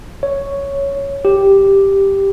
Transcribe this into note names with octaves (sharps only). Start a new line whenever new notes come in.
C#5
G4